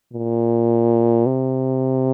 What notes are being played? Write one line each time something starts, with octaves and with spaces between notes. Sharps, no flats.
A#2
C3